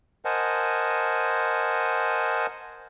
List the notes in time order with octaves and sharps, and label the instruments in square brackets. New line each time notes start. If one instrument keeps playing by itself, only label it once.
[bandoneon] A#4 C5 D#5 F#5 G#5 A5